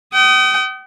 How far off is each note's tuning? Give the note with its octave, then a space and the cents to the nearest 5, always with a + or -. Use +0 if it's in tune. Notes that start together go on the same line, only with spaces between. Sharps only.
G5 -45 D#6 +0